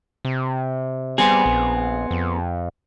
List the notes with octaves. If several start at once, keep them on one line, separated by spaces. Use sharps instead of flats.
C3
G3 B3 C4 G#4
A#1
F2